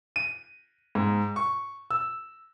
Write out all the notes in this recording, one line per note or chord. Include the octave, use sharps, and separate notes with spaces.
D#7
G#2
C#6
E6